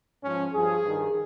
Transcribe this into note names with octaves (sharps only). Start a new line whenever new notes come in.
G#2 F3 C#4
G2 F3 G#4
G2 D#3